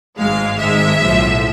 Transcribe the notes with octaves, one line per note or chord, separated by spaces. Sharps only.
G#1 G#2 G#3 F5
G#1 G#2 G#3 E5
B1 A2 F3